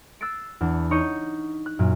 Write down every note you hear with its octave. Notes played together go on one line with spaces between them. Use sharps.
E6 F#6 A6 C7 D7
E2 D4
D#4 C#5 C#6 G6 C#7 D#7
F#6
F#2 A#2